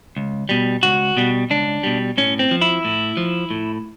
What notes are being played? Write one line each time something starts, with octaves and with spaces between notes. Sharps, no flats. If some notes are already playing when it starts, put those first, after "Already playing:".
C#2
B2 G3
C#2 F#4
B2 G3
C#2 D4
B2 G3
A2 C#4
C4
F3
E4
A2
F3
A2